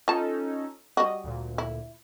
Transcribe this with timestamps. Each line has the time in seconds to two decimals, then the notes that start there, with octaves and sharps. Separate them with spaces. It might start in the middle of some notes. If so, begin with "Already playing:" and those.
0.08 C#4 D#4 F4 A4 A5
0.97 G3 F#4 D#5
1.24 D2 A#2
1.58 E4